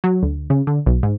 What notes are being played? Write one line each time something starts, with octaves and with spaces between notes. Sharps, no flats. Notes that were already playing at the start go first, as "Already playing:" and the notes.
F#3
D2
C#3
D3
B1
G#2